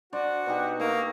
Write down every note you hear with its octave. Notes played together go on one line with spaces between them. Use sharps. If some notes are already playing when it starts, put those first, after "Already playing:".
D4 F#4 C5 D5
B2 D#4 G4
A3 A#3 D#4